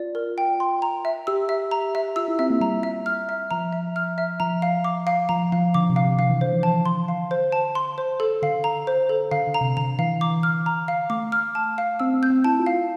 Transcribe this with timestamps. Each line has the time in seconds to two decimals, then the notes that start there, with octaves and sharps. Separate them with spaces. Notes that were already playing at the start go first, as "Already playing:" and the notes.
Already playing: F4 D5
0.15 A#4
0.38 G5
0.60 C6
0.82 A#5
1.05 E5
1.27 G4 E6
1.49 E5
1.71 A#5
1.95 E5
2.16 F4 E6
2.28 E4
2.39 C4 E5
2.50 A#3
2.61 G3 A#5
2.83 E5
3.06 F6
3.29 E5
3.51 F3 A#5
3.73 E5
3.96 F6
4.18 E5
4.40 F3 A#5
4.62 F5
4.84 D6
5.07 F5
5.29 F3 A#5
5.52 F3 F5
5.74 D3 D6
5.90 C3
5.96 F5
6.04 C3
6.19 D3 F5
6.30 E3
6.41 D3 C5
6.53 F3
6.63 D3 A5
6.86 C6
7.08 F5
7.31 C5
7.52 A5
7.75 C6
7.98 C5
8.20 A4
8.42 D3 F5
8.64 A#5
8.87 C5
9.09 A4
9.31 D3 F5
9.47 D3
9.54 A#5
9.61 C3
9.77 D3 A#5
9.99 E3 F5
10.21 D6
10.43 F6
10.66 A#5
10.88 F5
11.10 A3 D6
11.32 F6
11.55 A5
11.78 F5
12.00 C4 E6
12.14 C4
12.23 G6
12.30 C4
12.44 E4 A5
12.60 F4
12.66 F5
12.74 F4